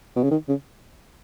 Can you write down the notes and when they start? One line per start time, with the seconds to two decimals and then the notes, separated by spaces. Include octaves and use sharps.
0.16 B2
0.24 C#3
0.31 D#3
0.49 C#3